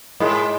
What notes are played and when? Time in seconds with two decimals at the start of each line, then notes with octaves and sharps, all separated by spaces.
0.20 G#2 G#3